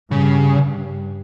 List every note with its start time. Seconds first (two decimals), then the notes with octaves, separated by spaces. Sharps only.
0.11 G2 C#3
0.56 G2